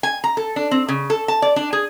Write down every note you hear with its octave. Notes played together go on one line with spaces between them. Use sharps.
G#5
A#5
A4
D4
C4
C#3
A4
A5
D5
D4
G#4